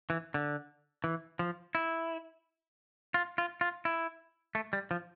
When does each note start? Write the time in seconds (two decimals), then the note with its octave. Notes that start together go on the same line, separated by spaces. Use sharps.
0.10 E3
0.34 D3
1.04 E3
1.39 F3
1.75 E4
3.14 F4
3.38 F4
3.61 F4
3.85 E4
4.55 A3
4.73 G3
4.91 F3